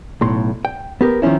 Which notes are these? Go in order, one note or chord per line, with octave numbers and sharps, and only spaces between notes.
B1 A2 C6
G5
B3 G4 A#4
D#3 F3 C4 C#4 E4